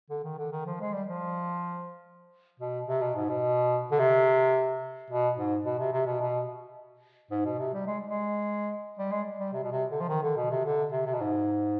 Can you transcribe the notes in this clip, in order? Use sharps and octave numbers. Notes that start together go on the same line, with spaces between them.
D3
D#3
D3
D#3
F3
G#3
G3
F3
B2
C3
B2
G#2
B2
D3
C3
B2
G#2
B2
C3
C3
B2
B2
G#2
B2
C3
G3
G#3
G#3
G3
G#3
G3
C3
B2
C3
D3
F3
D#3
D3
B2
C3
D3
C3
C3
B2
G#2